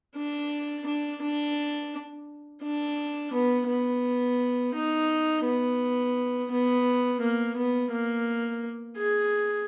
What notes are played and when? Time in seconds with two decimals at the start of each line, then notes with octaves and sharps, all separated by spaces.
0.16 D4
0.86 D4
1.21 D4
2.63 D4
3.33 B3
3.68 B3
4.74 D#4
5.44 B3
6.50 B3
7.21 A#3
7.56 B3
7.91 A#3
8.97 G#4